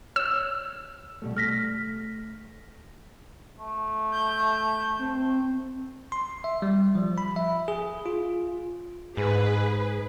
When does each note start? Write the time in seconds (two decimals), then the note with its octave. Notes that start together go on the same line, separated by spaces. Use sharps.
0.16 C#5 D5 E6
1.22 B2 G3 A3
1.37 A3 F6 A#6 B6
3.59 A3
4.12 G6
4.99 C4
6.12 C6
6.44 E5
6.62 G3
6.95 F3
7.18 B5
7.36 E5
7.68 G#4
8.06 F4
9.17 G#2 G#4 B4